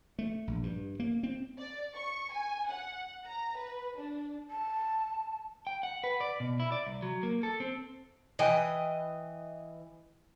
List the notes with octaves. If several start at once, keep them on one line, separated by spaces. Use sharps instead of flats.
A3
A#1
G2
A#3
C4
D5
C#6
G#5
F#5
A#5
B4
D4
A5
G5
F#5
B4
D5
B2
E4
D5
C2
F#3
A#3
A4
C4
E3 B4 D#5 G5 G#5